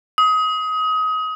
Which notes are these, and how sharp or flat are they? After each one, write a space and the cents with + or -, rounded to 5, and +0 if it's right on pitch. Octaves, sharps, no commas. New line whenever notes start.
D#6 +25